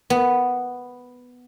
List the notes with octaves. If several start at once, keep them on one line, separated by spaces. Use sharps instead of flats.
B3